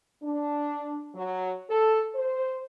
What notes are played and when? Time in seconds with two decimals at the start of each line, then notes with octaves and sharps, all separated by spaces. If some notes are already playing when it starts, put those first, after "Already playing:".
0.23 D4
1.15 F#3
1.69 A4
2.14 C5